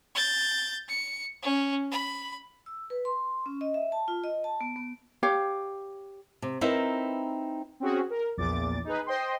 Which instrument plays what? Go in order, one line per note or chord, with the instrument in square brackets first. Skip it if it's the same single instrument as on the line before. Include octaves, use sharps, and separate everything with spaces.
[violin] G6 A6
C#7
C#4
B5
[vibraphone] E6
B4
C6
C#4
D#5
E5
A5
F4
D#5
A5
B3
B3
[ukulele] G4 C#5 F5
[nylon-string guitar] C3
C4 D#4 E4 A#4 B4 E5
[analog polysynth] C4 C#4 F#4 G#4
A#4
A#1 E2 A#2 D6 A6
D#4 G#4 B4
C5 D#5 G5 C6